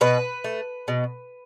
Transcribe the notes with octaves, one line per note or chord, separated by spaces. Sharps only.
B2 B4
A3
B2